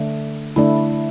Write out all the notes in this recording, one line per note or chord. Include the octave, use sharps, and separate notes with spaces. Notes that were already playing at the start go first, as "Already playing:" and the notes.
Already playing: D3 A3 D4
D3 A3 D4 E4